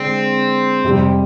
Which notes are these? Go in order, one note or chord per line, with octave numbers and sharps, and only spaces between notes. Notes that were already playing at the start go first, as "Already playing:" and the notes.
Already playing: D3 G#3 C4 D4
F2 C3 G3